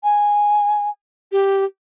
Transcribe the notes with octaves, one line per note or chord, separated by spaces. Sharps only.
G#5
G4